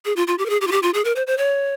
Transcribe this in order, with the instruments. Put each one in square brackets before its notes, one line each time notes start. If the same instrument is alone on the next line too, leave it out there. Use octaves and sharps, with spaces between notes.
[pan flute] G#4
F4
F4
G4
A#4
G#4
G4
F4
G4
F4
G#4
A#4
C5
C5
C#5